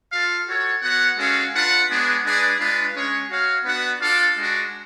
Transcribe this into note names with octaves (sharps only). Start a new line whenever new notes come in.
F4 A4 F5
F#4 A4 C#5
B3 F#4 C#5 F#5
G#3 C#4 F#4 A4 F5
D4 F4 B4 F#5
G#3 B3 D4 G#4 C#5
G#3 D4 G#4 B4 D5
G#3 D4 F4 B4
G#3 C#4 G#4 C#5
F#4 C#5 F5
B3 D4 F#4 B4 F#5
D4 F4 A4 D5 F5
G#3 D4 F#4